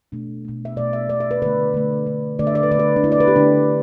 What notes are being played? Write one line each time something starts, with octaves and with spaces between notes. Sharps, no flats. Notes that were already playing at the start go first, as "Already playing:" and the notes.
B2 A3 D4
B2 A3
E5
B2 A3 D5
E5
B2 A3 D5
E5
B4
D3 A3 B4
D3 A3
D3 A3
D3 A3 D5
E5
D5
B4
D3 A3 B4 D5
D4
D3 A3 E4
D5
B4
G4
D3 A3 D4